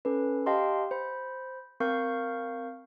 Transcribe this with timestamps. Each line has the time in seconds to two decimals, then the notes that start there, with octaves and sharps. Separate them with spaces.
0.05 C#4 A4 B4
0.46 G4 D#5 F5 G5 A5 C6
0.91 C5 B5
1.80 C4 A#4 F5 C#6 G6